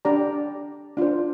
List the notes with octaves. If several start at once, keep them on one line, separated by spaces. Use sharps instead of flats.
D4 G4 D5 A#5
D4 F4 C5